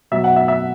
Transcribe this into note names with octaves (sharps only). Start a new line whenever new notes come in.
B2 F#3 E5
F#5
E5
E5